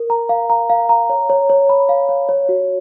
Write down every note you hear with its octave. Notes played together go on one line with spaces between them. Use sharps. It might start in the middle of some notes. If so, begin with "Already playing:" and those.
Already playing: A#4
A#5
F5
A#5
F5
A#5
C#5
C#5
C#5
B5
F5
C#5
C#5
F#4